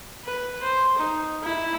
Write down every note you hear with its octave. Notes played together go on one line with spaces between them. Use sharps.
B4
C5
D#4
E4